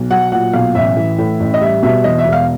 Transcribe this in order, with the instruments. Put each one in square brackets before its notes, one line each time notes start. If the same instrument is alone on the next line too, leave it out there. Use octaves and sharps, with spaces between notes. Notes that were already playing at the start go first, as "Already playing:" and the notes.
Already playing: [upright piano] B1
F#3 F#5
A#2 F#5
B1 F5
A1 E5
E3
A2
A1
D#5
G3 E5
B2 E5
E2 D#5
E5
E1
F5